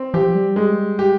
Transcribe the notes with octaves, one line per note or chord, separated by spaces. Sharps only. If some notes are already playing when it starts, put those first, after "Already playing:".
Already playing: C4
F3 G4
G3
G#3
G4